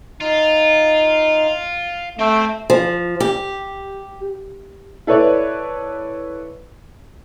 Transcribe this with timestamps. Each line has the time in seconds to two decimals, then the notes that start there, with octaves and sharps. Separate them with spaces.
0.21 D#4 F4
2.19 A3 C4 E5 G5
2.70 F3
3.20 G4
5.07 E4 A4 B4 C#5 D5